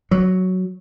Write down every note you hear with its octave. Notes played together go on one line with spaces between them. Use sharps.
F#3